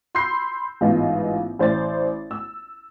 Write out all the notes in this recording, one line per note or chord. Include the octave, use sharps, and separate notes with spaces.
B5 C6 E6 G6 C7
A1 G#2 B3 F4 D#5
A1 C5 D5 A6
E6